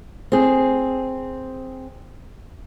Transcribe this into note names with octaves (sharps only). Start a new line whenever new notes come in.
C4 G#4